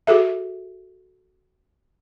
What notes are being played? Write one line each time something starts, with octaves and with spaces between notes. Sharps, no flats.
F#4 G#4 A4 E5